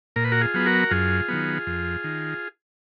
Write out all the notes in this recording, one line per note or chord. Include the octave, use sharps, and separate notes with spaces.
A#2 A#4
B4
F#4 A#4
F4 G#4
F#3 B3
F#4 A#4
F#2 F4 G#4
D#3 F#3 B3
F2
D#3